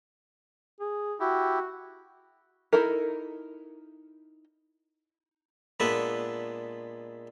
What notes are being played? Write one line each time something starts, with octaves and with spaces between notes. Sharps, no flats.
G#4
E4 F#4 G4
D#4 E4 A4 A#4
A#2 G#3 B3 D4 B4 E5